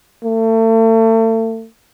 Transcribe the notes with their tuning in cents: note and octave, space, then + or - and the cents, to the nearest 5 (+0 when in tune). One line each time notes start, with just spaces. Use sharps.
A3 +35